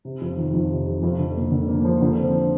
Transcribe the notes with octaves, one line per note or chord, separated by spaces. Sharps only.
C3
F2
D#3
F2
C3
C3
F2
D3
A#3
D3
A#3
F3
D3
C4